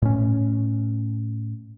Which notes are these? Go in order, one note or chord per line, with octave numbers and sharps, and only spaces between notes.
A2 C#4